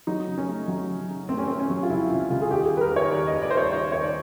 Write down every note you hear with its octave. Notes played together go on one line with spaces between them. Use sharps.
F#3 D#4
C#3
C#4
A3
F#3
C#3
C#3
A3 C4
C#4
A3 C4
C#4
F#3
F4
C#2 E4
C#2 F4
C#2 F4
G#4
D#2 G4
G4
G#4
G3
B4
A#4
D#2 C#5
D#3 D5
D#5
D#2
D5
G3 C5
C#5
D#3 C#5
D#2 C#5
D5